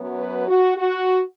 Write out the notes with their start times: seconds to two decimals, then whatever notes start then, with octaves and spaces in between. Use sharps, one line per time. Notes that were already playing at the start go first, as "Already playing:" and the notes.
Already playing: F#2 F#3 B3
0.19 B4
0.48 F#4
0.76 F#4